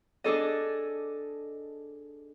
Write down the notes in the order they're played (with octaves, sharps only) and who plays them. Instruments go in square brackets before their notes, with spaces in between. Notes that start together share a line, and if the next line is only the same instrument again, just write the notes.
[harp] D4 G#4 A4 D#5